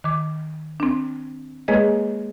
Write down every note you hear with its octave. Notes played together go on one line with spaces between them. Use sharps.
D#3 D6
C4 D4
G#3 A#3 G#4 B4 C#5 D#5